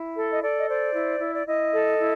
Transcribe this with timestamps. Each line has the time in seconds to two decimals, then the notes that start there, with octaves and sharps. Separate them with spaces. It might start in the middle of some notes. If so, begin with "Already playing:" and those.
Already playing: E4
0.16 A4
0.33 D#5
0.42 A4 D5
0.57 D#5
0.68 C5 D5
0.94 E4
1.20 E4
1.35 D5
1.46 E4 D#5
1.72 A4
1.99 E4